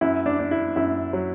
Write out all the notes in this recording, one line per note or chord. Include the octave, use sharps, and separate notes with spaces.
F#2 E4
D4
D4
E4
F#2 E4
F#3